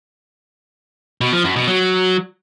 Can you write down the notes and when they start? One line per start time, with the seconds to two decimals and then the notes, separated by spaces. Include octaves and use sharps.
1.21 B2
1.33 F3
1.44 F#2
1.56 B2
1.68 F#3